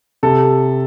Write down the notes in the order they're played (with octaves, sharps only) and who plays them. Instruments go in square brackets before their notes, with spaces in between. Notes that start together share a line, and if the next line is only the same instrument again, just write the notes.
[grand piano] C3 A4